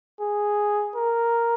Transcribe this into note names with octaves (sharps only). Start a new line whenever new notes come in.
G#4
A#4